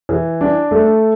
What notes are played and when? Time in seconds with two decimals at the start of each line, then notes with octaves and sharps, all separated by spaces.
0.09 E3
0.41 D4
0.71 A3